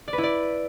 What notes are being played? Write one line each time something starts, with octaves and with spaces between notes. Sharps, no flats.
D5
B4
E4
D5